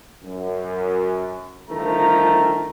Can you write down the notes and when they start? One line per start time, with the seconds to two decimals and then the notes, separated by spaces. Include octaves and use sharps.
0.23 F#2
1.69 G1 D#3 F3 A3 A#5